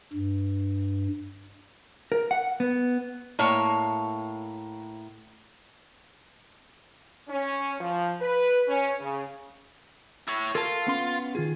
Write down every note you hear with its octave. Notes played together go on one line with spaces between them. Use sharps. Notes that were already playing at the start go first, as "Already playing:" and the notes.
G2
A#4
F#5
B3
A2 A#3 C#5
C#4
F3
B4
C#4
C#3
E4 C#5
F4 A4 A#4 A5
B3 C#4 C6
D#3 F4 G#4